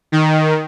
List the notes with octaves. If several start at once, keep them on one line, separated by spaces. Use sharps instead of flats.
D#3